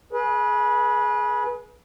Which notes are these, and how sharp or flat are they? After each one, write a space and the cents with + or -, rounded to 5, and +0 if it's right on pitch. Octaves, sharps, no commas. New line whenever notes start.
G#4 +20 B4 -25